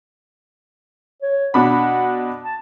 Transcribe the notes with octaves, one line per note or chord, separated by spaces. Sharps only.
C#5
B2 D4 F#5 B5
A5